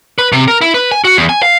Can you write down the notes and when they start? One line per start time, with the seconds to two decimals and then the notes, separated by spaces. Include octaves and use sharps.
0.18 B4
0.32 C3
0.48 A#4
0.61 E4
0.74 B4
0.92 G#5
1.05 F#4
1.17 E2
1.29 G#5
1.43 F5